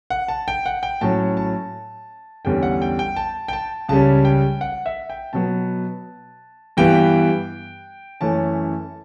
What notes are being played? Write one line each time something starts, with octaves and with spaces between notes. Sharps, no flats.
F#5
A5
G5
F#5
G5
A2 F#3 C#4 A5
A5
E2 D3 G3 C#4 G5
F#5
G5
G5
A5
G5
A5
C#2 C#3 G3 C#4 A5
G5
F#5
E5
G5
B2 F#3 B3 A5
G2 E3 G3 B3 G5
F#2 E3 A3 C#4 A5